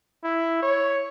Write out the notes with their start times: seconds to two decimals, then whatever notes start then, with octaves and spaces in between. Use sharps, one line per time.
0.24 E4
0.63 C#5